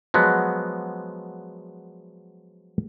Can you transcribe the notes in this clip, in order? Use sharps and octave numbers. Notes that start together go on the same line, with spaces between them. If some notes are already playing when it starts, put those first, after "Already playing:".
F3 F#3 G#3 B3